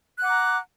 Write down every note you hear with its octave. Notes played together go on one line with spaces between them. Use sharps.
F#5 A#5 D6 F#6